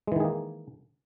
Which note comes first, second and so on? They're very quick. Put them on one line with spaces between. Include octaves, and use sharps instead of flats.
G#3 E3 D#3 G#4 A#3